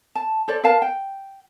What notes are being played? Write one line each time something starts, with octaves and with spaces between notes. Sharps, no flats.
A5
A4 C5 D5
A#4 B4 F5 A5
G5